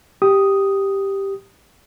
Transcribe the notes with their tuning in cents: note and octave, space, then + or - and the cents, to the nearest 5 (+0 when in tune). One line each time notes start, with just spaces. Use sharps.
G4 +0 D#6 +0